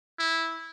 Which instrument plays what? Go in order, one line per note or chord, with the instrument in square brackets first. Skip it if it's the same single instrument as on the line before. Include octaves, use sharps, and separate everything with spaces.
[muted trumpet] E4